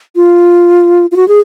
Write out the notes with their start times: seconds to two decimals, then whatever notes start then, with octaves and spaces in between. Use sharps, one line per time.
0.16 F4
1.12 F4
1.16 F#4
1.28 G#4